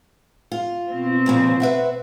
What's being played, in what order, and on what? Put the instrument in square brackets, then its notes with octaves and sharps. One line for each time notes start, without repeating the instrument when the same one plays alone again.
[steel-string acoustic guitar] F4
[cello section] B2 C4
[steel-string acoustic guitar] A#2 C#3 F3
B4 E5 F#5